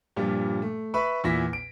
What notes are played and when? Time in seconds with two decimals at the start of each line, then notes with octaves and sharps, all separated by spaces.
0.16 G2 A#2 F3 G3
0.62 A3
0.94 B4 E5 B5 C#6
1.24 E2 A#2 E4 A#6 B6
1.53 D7